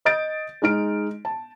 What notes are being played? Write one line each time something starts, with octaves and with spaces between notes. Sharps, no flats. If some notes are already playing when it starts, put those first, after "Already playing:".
D#5 D#6 G6 A6 D7
G#3 D#4 F6 D7
A5